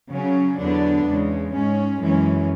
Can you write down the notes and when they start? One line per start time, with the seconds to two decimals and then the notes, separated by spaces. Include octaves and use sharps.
0.11 C#3 F#3 C#4
0.58 E2 D3 F#3 B3 D4
1.05 E2 C#3 G#3
1.53 G#2 G#3 C#4
2.00 F#2 E3 G#3 C#4